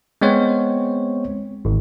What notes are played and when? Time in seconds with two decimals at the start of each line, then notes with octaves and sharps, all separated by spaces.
0.21 G#3 B3 C4 C5 C#5
1.65 G#1